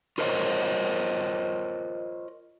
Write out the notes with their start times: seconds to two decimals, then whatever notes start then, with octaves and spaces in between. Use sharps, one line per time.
0.18 F4 A#4 C5 C#5 D#5